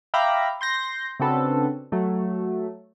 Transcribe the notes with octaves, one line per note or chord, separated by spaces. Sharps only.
E5 F5 G5 A#5 B5 D6
C6 G6 A#6
C#3 C4 D4 F#4 A4 B4
F#3 A3